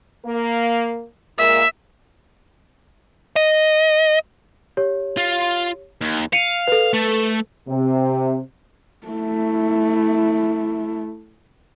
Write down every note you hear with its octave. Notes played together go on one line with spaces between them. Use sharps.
A#3
A#2 G#3 A#3 E5
D#5
G4 C#5
F4
D#2
F5 C#7 D#7
A4 B4
A3
C3
A3 E4